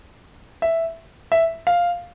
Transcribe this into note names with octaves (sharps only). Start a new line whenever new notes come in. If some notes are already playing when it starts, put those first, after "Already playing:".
E5
E5
F5